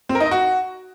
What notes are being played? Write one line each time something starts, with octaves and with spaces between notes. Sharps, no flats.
C4
A#4
D#4
D#5
F#4